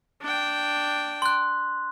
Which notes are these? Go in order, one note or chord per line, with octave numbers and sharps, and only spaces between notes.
D4 G5
C6 F#6